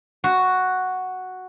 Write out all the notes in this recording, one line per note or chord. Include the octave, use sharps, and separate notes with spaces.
F#4